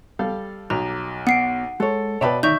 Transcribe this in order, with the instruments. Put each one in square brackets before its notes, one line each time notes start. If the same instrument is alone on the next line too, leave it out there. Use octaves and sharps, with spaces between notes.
[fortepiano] G3 A4 F5
[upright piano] B1 [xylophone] A#5
[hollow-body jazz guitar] B3 [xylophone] F#5 C7 D7
[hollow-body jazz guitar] G#3 C#5 [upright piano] A4
[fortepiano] B2 G5 A5 [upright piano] B4 D5 [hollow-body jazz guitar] C#5 E5 B5
[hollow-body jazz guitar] D2 D#3 D#4 [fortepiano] D5 [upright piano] E5 [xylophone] C#6 G6